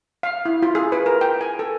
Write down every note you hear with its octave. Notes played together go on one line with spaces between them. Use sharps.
F5
E4
F4
G#4
B4
A#4
G5
G#5
A4